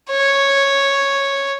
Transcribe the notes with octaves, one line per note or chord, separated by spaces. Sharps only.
C#5